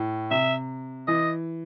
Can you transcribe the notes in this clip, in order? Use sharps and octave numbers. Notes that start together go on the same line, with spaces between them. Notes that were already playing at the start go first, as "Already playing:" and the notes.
Already playing: A2
C3 E5
E3 D#5